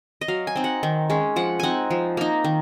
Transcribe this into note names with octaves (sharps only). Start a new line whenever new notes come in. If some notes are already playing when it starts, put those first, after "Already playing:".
D#5
F#3 F5
G#5
C4 D#4
F#5
D#3
G#3 C#4
F3 F#5
C4 D#4 F#5 G#5
F3
A#3 D#4
D#3